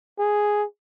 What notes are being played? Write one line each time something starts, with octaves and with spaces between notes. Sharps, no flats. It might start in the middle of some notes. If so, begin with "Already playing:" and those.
G#4